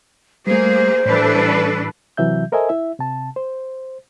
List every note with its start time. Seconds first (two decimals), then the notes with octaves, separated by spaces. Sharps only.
0.47 G3 A3 A#3 G#4 C5
1.06 A2 E3 G3 D4 A4 B4
2.17 C3 E3 F#3 E5 G6
2.52 A4 A#4 C5 D#5 E5 G#5
2.69 E4 E5
2.99 C3 A5
3.36 C5